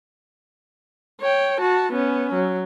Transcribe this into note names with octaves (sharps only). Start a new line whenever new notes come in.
C#5 G5
F#4 A5
B3 C#4
F#3